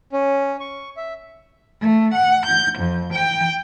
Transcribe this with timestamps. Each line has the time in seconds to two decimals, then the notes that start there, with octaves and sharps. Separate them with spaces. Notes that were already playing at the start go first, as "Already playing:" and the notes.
0.12 C#4
0.60 C#6
0.97 E5
1.81 A3
2.13 F#5
2.46 G6
2.79 F2
3.13 G5